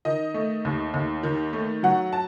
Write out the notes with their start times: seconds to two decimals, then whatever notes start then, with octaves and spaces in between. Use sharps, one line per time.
0.05 D#3 D#5
0.34 A3
0.65 D#2
0.94 D#2
1.23 D#3
1.53 A3
1.83 F#3 F#5
2.13 A5